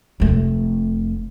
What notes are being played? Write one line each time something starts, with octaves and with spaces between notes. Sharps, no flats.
F1 A3